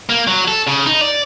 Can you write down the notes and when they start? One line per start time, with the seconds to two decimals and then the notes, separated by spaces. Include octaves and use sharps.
0.10 A#3
0.27 F#3
0.48 A4
0.67 C#3
0.86 D#4
1.01 D5